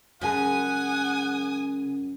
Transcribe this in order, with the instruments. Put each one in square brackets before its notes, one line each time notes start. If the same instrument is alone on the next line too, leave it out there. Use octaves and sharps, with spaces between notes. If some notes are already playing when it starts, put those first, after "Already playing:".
[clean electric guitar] C#2 G#4 [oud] F#2 [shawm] F#5 [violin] G#5 D#6